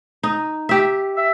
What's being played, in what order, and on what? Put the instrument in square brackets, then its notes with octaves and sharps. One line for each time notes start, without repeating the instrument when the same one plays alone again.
[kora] D#4
G4 E5
[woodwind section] E5